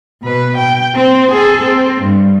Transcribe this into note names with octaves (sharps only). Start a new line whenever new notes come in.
B2 B4
G5
C4
G#4 A4
C4
G2